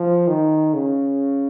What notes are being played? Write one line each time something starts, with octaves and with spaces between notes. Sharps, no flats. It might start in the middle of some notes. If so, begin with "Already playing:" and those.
Already playing: F3
D#3
C#3